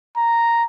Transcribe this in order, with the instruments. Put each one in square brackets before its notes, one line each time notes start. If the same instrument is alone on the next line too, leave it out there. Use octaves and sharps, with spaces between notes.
[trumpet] A#5